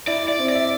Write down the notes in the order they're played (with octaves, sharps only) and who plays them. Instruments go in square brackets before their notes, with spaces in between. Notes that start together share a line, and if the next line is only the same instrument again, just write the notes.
[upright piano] E4 [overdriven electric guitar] D5
[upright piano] E4
[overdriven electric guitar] D5
[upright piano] C4
[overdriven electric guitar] D5
[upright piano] E5